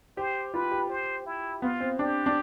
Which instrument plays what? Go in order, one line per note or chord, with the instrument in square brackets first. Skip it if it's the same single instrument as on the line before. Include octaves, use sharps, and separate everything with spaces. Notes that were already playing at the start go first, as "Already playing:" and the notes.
[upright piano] G4 [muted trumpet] C5
[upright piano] F4 [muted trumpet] B4
[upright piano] G4
[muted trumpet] C5
E4
[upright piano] B3 [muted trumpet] F4
[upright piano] C4
[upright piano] D4 [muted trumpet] G4
[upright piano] D4